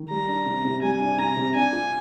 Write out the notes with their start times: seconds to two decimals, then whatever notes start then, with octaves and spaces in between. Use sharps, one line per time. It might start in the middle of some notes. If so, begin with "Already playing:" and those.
Already playing: D#3
0.10 G3 A#5
0.28 D4
0.46 C3
0.64 C3
0.82 G3 G#5
1.00 D4
1.18 C3 A#5
1.36 C3
1.54 D4 G#5
1.72 F4